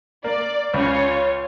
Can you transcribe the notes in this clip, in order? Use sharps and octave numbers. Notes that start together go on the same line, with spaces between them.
A#3 D5
C#2 C#3 F4 C#5